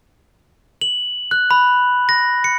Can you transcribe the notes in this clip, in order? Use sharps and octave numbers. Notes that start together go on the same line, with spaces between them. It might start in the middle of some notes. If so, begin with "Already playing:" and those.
F#7
F#6
B5
A#6
C#7